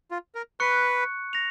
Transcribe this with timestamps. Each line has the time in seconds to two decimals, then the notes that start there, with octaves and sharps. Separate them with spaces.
0.11 F4
0.35 A#4
0.60 B4 C#6 F#6 C#7
1.33 A#6 F7